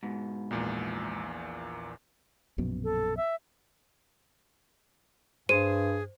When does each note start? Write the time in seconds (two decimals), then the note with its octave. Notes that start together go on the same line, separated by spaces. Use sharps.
0.03 G#2 B2
0.51 A#1 E2 A#2
2.58 A#1 F#2 B2
2.84 A4
3.17 E5
5.49 G2 G#4 C5 D#7